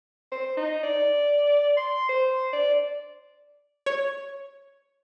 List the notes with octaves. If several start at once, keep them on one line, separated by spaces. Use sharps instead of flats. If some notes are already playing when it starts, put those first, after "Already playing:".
C5
D#4
D5
C6
C5
D5
C#5